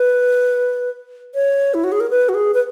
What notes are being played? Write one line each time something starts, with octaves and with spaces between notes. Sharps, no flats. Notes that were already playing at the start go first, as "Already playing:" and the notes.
Already playing: B4
C#5
E4
F#4
G#4
A#4
B4
F#4
G#4
B4